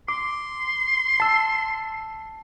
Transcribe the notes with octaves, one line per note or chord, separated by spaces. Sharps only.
C6 D6
A5 E6